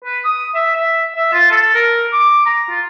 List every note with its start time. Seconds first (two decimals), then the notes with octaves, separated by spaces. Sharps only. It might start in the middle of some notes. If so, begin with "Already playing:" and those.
0.04 B4
0.25 D#6
0.55 E5
0.76 E5
1.16 E5
1.33 F4
1.51 A4
1.74 A#4
2.13 D6
2.46 A#5
2.70 F4